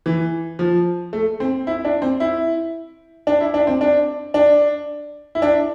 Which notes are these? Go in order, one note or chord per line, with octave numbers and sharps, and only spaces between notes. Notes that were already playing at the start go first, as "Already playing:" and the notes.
E3
F3
A3
C4
E4
D4
C4
E4
D4
E4
D4
C4
D4
D4
E4
D4